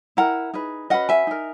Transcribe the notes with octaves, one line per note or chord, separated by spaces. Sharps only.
E4 A#4 F#5 A#5
D#4 G#4 B4
C#4 F#4 B4 D#5 F#5
E5 G#5
D#4 A#4